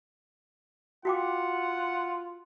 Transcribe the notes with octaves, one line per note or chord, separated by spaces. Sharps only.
F4 F#4 F#5 G5 D6